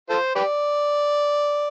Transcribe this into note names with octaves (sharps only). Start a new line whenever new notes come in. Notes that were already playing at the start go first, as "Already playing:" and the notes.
F4 A4 C5
G4 B4 D5